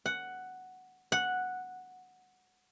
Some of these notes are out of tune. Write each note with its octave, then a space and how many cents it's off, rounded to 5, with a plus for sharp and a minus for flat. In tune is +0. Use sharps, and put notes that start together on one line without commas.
F#5 +5
F#5 -5